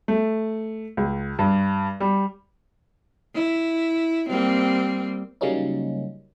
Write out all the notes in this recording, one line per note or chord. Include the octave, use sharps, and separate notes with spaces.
A3
C#2
G2
G3
E4
G3 A#3 C4
C#3 F#3 G3 A#3 C#4 D#4